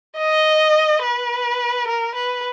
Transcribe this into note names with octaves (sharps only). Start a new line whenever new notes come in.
D#5
B4
A#4
B4